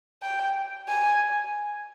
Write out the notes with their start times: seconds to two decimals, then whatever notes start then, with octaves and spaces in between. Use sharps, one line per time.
0.22 G5
0.88 G#5